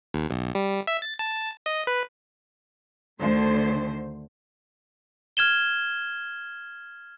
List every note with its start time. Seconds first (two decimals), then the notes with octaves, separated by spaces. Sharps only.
0.14 D#2
0.31 B1
0.55 G3
0.87 E5
1.02 A6
1.19 A5
1.66 D#5
1.87 B4
3.20 D2 D3 D#3 C5
5.37 F6 G#6 E7 G7